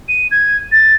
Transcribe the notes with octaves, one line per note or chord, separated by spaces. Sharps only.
D#7
G#6
A6